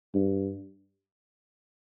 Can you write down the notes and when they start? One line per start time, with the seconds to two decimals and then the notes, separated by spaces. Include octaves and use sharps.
0.14 G2